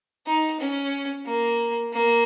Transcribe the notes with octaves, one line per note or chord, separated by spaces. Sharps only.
D#4
C#4
A#3
A#3